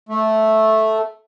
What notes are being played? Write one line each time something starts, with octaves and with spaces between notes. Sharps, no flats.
A3